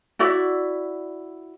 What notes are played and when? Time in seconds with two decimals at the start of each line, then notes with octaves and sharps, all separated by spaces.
0.19 E4 F#4 D5 E5